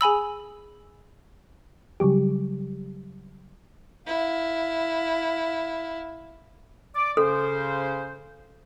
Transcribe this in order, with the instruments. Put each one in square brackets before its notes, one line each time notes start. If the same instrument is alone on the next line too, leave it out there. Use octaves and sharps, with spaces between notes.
[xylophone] G#4 G#5 B5 E6
[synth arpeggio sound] C#3 F#3 G3 G4
[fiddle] E4 F5
[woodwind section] D5 D6
[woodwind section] C#3 C#4 C5 [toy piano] A4